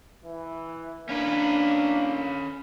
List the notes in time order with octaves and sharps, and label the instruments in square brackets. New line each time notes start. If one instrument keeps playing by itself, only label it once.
[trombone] E3
[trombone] A#3 [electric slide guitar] C#4 B4 [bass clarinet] D4